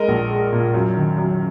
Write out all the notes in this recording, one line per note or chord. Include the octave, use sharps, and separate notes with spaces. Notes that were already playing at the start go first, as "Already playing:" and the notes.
Already playing: G#3 A#4 D#5
A#1
G#3
A#2
F#2
D#3
F#2